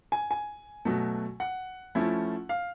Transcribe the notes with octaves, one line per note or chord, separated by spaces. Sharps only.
G#5
G#5
B2 F#3 A3
F#5
F3 A3 C#4 E4
F5